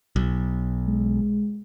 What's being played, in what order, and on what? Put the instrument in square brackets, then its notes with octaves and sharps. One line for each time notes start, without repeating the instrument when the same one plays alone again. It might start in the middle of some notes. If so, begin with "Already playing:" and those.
[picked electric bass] B1
[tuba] G#3